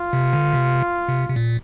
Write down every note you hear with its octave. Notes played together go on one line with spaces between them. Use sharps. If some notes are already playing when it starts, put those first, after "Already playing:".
Already playing: F4
C3
D3
C3
C3
C3
A#2